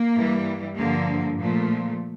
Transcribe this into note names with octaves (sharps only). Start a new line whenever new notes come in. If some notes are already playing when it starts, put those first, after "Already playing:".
Already playing: A#3
G2 E3 G3
G2 D3 F3 A#3
A#2 F3 A3